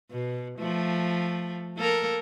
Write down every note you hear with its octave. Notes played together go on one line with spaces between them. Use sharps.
B2
F3 A3
A#3 A4 A#4